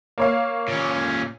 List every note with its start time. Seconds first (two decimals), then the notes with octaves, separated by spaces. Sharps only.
0.18 A#3 C#5 F5
0.68 A#2 C#4